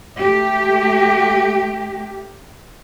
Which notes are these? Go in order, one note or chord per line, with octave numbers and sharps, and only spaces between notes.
A3 G4